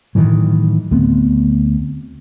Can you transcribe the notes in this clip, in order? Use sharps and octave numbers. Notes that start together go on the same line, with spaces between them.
A2 D#3 E3 F#3
D2 A3 B3 C4